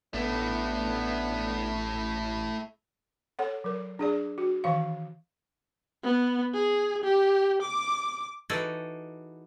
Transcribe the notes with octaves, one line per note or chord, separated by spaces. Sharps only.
A1 D3 A3 B3 E4
A4 C#5 F#5
F#3 A#4
D4 G#4 D5
F#4
D#3 E3 F5
B3
G#4
G4
D6
E3 D#4 F#4 G#4 A4 D5